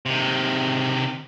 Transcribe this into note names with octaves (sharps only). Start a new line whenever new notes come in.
C3 D#3